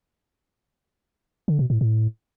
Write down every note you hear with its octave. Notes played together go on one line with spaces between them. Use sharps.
D3
B2
A2
A2